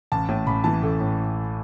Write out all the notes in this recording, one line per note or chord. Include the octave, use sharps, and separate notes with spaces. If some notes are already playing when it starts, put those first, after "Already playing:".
A1 A5
A2
A1 B5
E3 A5
A1 A4
A2